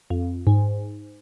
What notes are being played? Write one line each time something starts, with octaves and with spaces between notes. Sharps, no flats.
F2
G#2